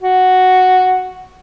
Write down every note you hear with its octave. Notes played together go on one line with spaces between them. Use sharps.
F#4